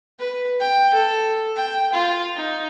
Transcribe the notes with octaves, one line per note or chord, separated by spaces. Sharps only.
B4
G5
A4
G5
F4
D#4